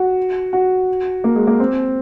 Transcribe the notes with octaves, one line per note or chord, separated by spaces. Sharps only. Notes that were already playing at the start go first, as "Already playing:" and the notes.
Already playing: F#4
F#4
A#3
G#3
A#3
C4